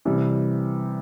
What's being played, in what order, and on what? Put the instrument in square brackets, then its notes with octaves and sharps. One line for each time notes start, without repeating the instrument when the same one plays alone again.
[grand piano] C3 E3 G3